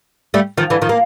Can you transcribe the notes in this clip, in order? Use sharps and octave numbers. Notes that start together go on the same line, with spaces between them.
G3 A3
D#3 F3
D3 E3
D#3 F3
A#3